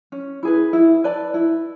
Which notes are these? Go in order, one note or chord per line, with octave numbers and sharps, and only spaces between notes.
C#4
E4 G#4 B4
E4
B4 D5 A5
E4